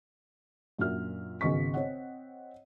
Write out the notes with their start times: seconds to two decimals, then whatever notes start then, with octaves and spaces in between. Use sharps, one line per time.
0.78 F#2 A#2 D4 F#4 E5 F6
1.41 G#1 C#3 B3 D#5 C#6 B6
1.74 C4 C#5 D#5 F#5